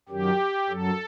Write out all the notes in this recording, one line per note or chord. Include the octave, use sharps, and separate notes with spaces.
F#2 D#3 F#3 G4
F#2 F#3 A4